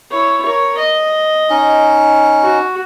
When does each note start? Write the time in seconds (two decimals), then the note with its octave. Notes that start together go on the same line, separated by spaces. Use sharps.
0.11 E4 C#5
0.42 A#4 C#5
0.78 D#5
1.50 C#4 D#4
2.42 F#4